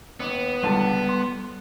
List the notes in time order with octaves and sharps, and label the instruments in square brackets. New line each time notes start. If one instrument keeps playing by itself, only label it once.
[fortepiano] D#2 [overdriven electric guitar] B3
[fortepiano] C#2 D3 A5 [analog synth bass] G3
[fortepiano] C6